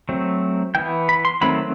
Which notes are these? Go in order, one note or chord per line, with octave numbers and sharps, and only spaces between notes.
F#3 A3 C4
E3 B3 G5
B5
C6
D#3 F#3 A3 C4 B5